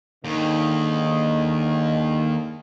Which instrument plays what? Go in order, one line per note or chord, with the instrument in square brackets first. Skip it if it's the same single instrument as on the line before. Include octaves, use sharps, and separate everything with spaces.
[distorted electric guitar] D#2 [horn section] G#2 D3 D#3